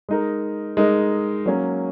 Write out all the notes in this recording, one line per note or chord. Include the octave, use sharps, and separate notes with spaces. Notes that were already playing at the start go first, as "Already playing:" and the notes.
G#3 D#4 A#4
G#3 D#4 A#4
F#3 A#3 C#4